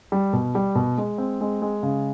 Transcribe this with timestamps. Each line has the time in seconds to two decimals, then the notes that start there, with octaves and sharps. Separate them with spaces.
0.12 G3
0.33 B2
0.55 G3
0.75 B2
0.98 G#3
1.18 C4
1.41 G#3
1.62 G#3
1.83 C#3